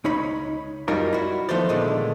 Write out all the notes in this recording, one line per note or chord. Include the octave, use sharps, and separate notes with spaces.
C#2 D#4 C#5 B5
F#2 G3 D#4 F4 A#4 C#5
E4 F#4
D#3 F3 A3 B3 C5 D5
A#2 D3 D#3 G#3 A3 B3